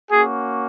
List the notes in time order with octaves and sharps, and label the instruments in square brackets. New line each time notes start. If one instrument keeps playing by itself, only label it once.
[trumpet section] A#3 C#4 F#4 G#4